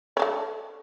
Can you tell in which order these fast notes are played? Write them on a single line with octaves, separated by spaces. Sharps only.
C#5 D4 A3